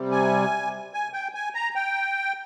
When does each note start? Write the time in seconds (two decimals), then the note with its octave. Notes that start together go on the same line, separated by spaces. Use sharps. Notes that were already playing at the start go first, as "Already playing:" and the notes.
Already playing: C3 G3
0.12 G#5
0.94 G#5
1.13 G5
1.34 G#5
1.55 A#5
1.75 G5